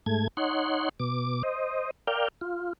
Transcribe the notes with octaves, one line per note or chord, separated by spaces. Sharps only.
G#2 A3 G#6
D#4 C#5 F#5 C6
B2 D6
C5 D#5
A#4 D5 F5 G5
F4